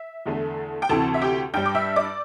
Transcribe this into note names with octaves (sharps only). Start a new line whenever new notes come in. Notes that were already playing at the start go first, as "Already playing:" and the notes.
Already playing: E5
E2 D3 A3
G5
D2 C3 E3 A4 A5
E5
G4 G5
G2 G3 G5 G6
D6
E5 E6
D5 D6